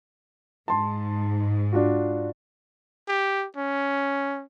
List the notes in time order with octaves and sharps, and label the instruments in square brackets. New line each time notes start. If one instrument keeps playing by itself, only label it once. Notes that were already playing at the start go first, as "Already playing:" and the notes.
[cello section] G#2 [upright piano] A5 C6
[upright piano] D4 F4 F#4
[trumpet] G4
C#4